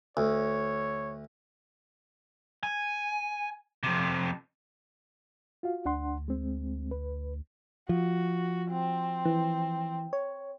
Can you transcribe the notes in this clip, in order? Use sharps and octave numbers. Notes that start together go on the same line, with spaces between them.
D2 C#5
G#5
F2 C3
F4 F#4 F5
D2 D4 F#5 C6
G#3 C4
B4
F3 F#4
C4
E3
C#5